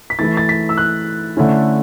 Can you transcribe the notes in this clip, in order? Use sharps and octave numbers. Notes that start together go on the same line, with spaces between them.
B6
E3 A3 E4 A6
A6
B6
E6
F#6
D3 A3 C#4 E4